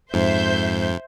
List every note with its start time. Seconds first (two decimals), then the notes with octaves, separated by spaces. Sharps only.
0.14 F2 G#2 C5 E5 G6